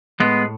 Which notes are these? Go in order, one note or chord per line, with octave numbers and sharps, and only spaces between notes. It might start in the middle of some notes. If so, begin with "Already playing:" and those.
A2 G#3 B3